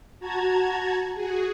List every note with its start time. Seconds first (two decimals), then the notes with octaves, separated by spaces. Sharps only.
0.20 F#4 A5 A#5 G#6
1.14 F#4 G#4